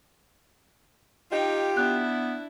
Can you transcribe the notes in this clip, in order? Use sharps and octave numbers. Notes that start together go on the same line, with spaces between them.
D#4 F4 G4 D#5 G5
B3 D4 E4 F#6